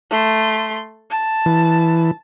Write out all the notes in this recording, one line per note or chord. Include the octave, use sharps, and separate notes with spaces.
A3 C6
A5
E3